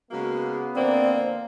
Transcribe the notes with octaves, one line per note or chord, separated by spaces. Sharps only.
C#3 G#3 A#3 B3 F#4
D3 F3 A#3 C4 D5